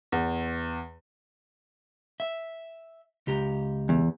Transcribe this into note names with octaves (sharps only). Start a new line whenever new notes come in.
E2
E5
C#2 G4 A#5
E2